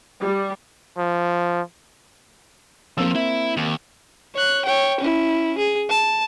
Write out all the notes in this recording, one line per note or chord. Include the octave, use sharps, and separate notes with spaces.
G3
F3
F3 A#3 C4 E6
E4 E5
D#2
C#5 F#6
C#5 G5
C#4 E4
G#4
A5